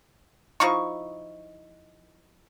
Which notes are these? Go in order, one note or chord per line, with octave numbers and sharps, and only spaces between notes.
F3 D#4 E4 C#6